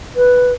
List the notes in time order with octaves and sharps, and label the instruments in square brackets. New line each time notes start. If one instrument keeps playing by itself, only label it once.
[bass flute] B4